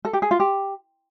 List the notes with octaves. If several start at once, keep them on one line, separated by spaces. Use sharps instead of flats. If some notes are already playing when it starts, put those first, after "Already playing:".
A4
G4
G#4
F4
G4